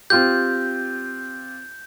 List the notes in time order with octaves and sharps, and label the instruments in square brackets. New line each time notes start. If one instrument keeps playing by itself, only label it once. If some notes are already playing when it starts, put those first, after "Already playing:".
[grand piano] C4 F4 G4 [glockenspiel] G6